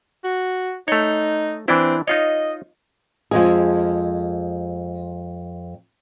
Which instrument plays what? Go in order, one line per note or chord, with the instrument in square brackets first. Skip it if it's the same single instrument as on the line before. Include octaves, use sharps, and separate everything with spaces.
[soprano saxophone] F#4
[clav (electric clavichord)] A3 C#5 [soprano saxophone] D#4
[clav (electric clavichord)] E3 D4 E4 [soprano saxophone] C4
[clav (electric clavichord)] D#4 F4 C#5 [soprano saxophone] D#5
[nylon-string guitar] F2 G#3 G#4